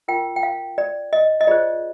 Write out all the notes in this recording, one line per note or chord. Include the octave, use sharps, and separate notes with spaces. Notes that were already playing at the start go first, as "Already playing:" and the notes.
F4 A#4 G5
G5
F5
D5
D#5
D#5
F4 G#4 C5 D5